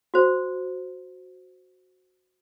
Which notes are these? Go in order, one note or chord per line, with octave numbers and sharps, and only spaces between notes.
F#4 C5